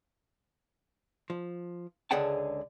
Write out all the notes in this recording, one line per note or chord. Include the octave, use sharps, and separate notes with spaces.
F3
C#2 D3 G#4 F#5 G5 A5